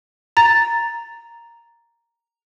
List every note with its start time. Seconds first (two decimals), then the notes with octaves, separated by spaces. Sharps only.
0.37 A#5 A6